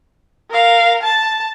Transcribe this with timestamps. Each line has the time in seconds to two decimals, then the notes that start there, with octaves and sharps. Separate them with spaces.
0.50 A#4 F5
1.03 A5